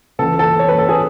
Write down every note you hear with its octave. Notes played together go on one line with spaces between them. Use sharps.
C#2 C#3 E3 A4
A4
C#5
B4
A4
G#4